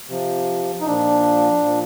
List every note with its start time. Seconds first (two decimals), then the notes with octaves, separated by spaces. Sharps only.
0.09 C3 F3
0.81 D#4
0.86 A#2 F3 D4
1.65 A#2 F3